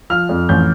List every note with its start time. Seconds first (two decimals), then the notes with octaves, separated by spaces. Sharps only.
0.10 F3 F6
0.29 F2
0.49 A1 G6